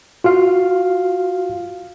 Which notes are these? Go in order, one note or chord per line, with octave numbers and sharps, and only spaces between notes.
F4 F#4 F5